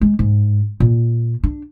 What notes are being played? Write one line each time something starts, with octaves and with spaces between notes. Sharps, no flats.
G#3
G#2
A#2
D4